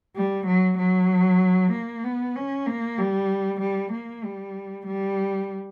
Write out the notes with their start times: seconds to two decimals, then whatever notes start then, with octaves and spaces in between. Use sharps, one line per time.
0.16 G3
0.47 F#3
0.78 F#3
1.72 A#3
2.04 B3
2.36 C#4
2.66 A#3
2.98 G3
3.60 G3
3.92 A#3
4.24 G3
4.87 G3